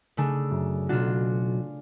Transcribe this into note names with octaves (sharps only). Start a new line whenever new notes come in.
C#3 A3 D4
F#2
B1 D4 F4 F#4